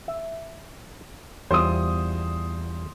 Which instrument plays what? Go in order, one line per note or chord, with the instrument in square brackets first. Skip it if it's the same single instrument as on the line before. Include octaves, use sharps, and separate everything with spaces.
[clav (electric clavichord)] E5
[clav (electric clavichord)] E2 G3 F4 [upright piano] C5 D#6